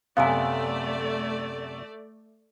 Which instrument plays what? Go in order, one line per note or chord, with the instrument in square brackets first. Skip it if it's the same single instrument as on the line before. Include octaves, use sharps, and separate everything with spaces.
[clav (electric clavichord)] F#2 C3 B3 [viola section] A3 D5 [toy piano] F5 G#5